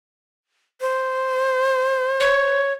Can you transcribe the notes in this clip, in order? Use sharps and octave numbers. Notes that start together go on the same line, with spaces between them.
C5
C#5